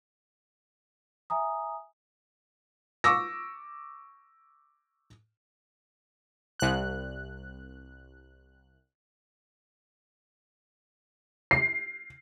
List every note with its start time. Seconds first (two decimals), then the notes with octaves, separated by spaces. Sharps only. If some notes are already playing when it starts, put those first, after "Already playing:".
1.30 E5 G#5 A#5 D#6
3.04 C#6 D6 E6 A#6
6.60 C2 F#6
11.51 C7